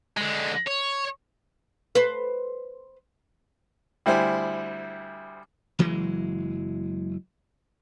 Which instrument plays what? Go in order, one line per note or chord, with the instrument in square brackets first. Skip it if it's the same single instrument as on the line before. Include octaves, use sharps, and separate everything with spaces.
[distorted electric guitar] D3 G#3
C#5
[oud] B4 C5
[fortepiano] D2 G3 E4 C5 G#5
[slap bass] F#1 E3 F#3 G#3